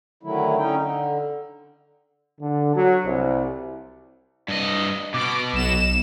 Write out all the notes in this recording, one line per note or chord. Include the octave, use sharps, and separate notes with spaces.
D3 D#3 F#3 A3 E4
D3 C#4 D#4 G5
D3
D3
F#3
C2
G2 D#5
B2 D6
B1 E7